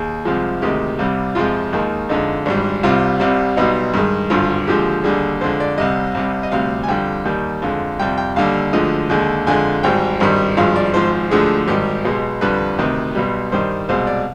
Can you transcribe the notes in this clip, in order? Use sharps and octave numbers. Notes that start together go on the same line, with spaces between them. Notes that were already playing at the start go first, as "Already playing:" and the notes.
Already playing: D#2 G#4
C2 C3 F3 G#3
D2 C3 D#3 G#3 G4
C2 C3 G3
F2 C3 F3 G#3 F4
D#2 D#3 G#3
F2 D3 G#3 D#4
G#1 G#2 G3 D4
C2 C3 G3 F4
C2 C3 G3
B1 B2 G3 D#4
G2 D#3 G#3
G#1 G2 D3 F4
D#2 D3 F3 G#3 G4
D#2 D3 G3 G#4
F2 D3 G#3 C5
D5
C2 C3 G3 D#5
C2 C3 G3
D#5
D2 C3 G3 F5
G#5
F2 D3 G3 G5
D#2 D#3 G3
F2 D3 G#3
F2 C3 G3 G5
G5
D#2 D3 G3 F5
D2 D3 F3 G#3 D#5
D#2 D3 G#3
F2 D3 G#3 G#5
G#1 G#2 G3 G5
G#1 G2 D#3 G3
G#1 G2 F3 G#3 F5
D5
G#1 G#2 F3 C5
D2 D3 F3 G#3 G#4
G#1 G#2 D#3 G3 G4
B1 B2 G#3
F2 D3 G3 B4
D2 C3 D#3
B1 B2 G3
G2 D#3 G3 C5
C2 B2 G#3 C5
D5